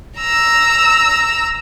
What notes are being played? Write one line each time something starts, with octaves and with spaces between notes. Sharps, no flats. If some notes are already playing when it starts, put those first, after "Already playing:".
A#5 E6